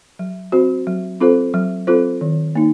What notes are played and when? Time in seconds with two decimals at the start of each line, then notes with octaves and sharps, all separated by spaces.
0.19 F#3
0.52 C4 F#4 C5
0.87 F#3
1.20 C4 F4 A4 C5
1.54 F#3
1.87 C4 F4 A4 C5
2.21 D#3
2.55 A#3 D#4